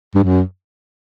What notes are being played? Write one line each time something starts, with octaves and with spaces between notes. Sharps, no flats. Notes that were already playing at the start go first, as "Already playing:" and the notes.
G2
F#2